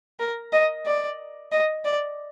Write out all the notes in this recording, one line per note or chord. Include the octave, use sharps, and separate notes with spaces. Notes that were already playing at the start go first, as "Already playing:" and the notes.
A#4
D#5
D5
D#5
D5